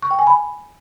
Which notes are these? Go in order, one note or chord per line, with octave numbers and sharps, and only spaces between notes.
C#6
G5
G#5
B5